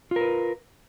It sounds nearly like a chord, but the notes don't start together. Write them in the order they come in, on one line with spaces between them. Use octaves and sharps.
F4 A#4 B4